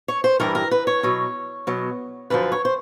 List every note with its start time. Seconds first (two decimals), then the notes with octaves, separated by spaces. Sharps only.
0.08 C#5
0.24 C5
0.40 G2 E3 G3 A#4
0.55 A#4
0.71 B4
0.87 C#5
1.03 B2 F#3
1.67 B2 F#3
2.30 F#2 D3 F3 B4
2.52 C#5
2.65 C5